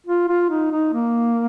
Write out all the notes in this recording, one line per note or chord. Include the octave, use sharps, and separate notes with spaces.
F4
F4
D#4
D#4
A#3